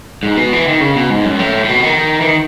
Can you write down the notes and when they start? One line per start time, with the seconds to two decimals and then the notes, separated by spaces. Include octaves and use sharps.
0.23 G#2
0.37 B2
0.53 E3
0.68 D#3
0.80 C#3
0.96 B2
1.10 G#2
1.25 F#2
1.39 A2
1.65 A2
1.69 B2
1.83 D#3
2.21 E3
2.26 D#3